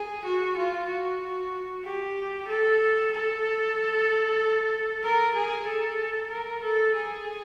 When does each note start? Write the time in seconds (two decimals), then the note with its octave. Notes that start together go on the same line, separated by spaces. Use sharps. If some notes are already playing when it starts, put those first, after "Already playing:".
Already playing: G#4
0.25 F#4
0.57 F4
0.89 F#4
1.84 G4
2.48 A4
3.12 A4
5.03 A#4
5.35 G#4
5.66 A4
6.30 A#4
6.62 A4
6.94 G#4